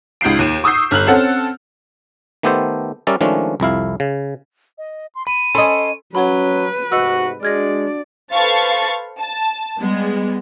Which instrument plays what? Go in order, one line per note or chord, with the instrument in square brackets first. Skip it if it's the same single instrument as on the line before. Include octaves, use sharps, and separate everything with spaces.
[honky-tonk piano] C#2 D#4 G6 C7 D7
D#2 D#7 E7
C#6 D#6 E6 G6 C7
G1 F6 F#6 F#7
C4 C#4 A4 F#5
[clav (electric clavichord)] D#3 A3 B3 G4 A4 C5
G3 C#4 A#4 D5 E5
D#3 F3 G#3 A3 C#4 D4
C2 F2 E4 F5
C#3
[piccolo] D#5
C6
[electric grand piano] B5 [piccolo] D#7
[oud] C#4 D#5 [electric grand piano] A4 B5 C6
[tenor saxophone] F#3 [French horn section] C#4 [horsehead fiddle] B4 [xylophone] C#5 F#5 B5
[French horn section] G#2 C3 A3 [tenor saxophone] F#4 [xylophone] D#5 E6
[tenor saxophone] G#3 [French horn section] D4 F#4 [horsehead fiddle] D5 [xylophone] F6 G#6 A#6
[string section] A4 B4 C5 F5 C#6 A6
A5
G3 G#3 B3